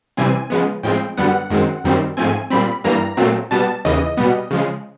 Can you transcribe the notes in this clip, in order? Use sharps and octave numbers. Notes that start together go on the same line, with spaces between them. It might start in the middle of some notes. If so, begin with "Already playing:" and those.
C3 E3 G3 C4 G#5
C#3 F3 G#3 B3
A2 F3 G#3 C4 G5
F#2 D3 G3 B3 F#5
F#2 D#3 G#3 C4
F#2 D#3 G3 C4
G#2 F3 A3 C4 G#5
A#2 G3 C4 B5
G2 E3 G3 A#3 A#5
A#2 F#3 A3 C4
B2 G3 B3 A5
D#2 C#3 E3 D#5
B2 G3 B3
C#3 F3 G#3